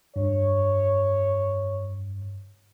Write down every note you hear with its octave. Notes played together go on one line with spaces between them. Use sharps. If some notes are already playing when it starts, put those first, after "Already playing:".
G2 C#5